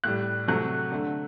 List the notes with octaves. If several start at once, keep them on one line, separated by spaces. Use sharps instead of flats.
A2 G3 F#6
C3 F#3 A3 F#6
D3 A3